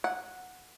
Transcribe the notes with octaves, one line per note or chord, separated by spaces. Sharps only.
F#5